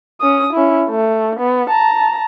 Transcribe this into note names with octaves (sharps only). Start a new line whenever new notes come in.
C#4 D#6
C#4 E4
A3
B3
A5 A#5